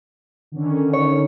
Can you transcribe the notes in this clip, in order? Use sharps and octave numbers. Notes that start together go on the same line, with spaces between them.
D3 D#3 C#4
C#5